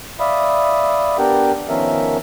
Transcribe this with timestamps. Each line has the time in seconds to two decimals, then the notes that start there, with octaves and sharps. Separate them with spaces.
0.20 D5 E5 F5 B5 D#6
1.18 B3 D4 G4 A#4 F#5 G5
1.69 D#3 F3 B3 C#4 A#4 E5